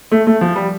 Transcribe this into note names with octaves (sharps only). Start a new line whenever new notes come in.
A3
A3
F3
G3